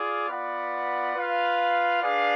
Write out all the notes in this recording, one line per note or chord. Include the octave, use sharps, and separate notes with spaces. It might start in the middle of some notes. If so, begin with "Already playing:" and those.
Already playing: F4 G#4 D5 F5
B3 F4 B4 D5 F#5
F4 B4 F5
D4 G#4 B4 D5 F5